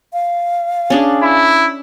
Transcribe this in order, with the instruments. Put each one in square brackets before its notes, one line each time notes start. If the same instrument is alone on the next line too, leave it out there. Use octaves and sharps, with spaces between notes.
[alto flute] F5
[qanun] C#4 D4 G#4
[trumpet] E4